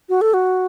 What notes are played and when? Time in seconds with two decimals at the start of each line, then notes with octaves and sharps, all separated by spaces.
0.09 F#4
0.21 A4
0.34 F#4